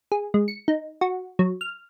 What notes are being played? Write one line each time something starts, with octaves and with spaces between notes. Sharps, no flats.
G#4
G#3
C#7
D#4
F#4
F#3
F6